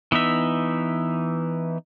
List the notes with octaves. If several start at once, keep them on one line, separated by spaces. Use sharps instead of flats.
E3 B3 D#4 E5